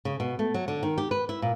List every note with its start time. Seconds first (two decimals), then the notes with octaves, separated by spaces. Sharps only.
0.05 C#3
0.20 B2
0.39 A3
0.54 F#3
0.68 D3
0.83 D#3
0.98 G4
1.11 B4
1.29 E4
1.42 A#2